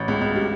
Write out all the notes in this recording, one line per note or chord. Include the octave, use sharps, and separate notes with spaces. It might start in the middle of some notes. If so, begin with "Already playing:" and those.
Already playing: A1
C#2
C#2
G3